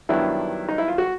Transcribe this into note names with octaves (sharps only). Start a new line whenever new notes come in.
G2 D#3 F#3 B3 D4 E4
D#4
E4
F4
F#4